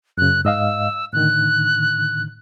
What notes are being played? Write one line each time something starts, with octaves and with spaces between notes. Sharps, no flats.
F#2 C#3 F#6
G#2 D#5 F5 E6
A2 D3 D#3 F#6